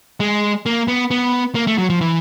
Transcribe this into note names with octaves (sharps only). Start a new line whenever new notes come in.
G#3
A#3
B3
B3
A#3
A3
F#3
F3
E3